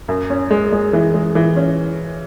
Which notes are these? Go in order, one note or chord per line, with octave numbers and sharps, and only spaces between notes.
F#2
C#4
G#3
G#3
E3
G#3
E3
C#4